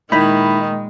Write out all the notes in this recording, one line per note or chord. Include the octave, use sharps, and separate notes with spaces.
A#2 D#3 G#3 D#4 E4 B5